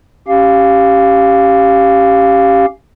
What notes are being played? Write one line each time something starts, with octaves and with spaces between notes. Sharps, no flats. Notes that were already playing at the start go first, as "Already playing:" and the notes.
C#4 G4 F5